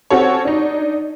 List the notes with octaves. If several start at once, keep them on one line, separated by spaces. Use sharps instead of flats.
C4 C#4 F#4 A4 C#5
D4 D#4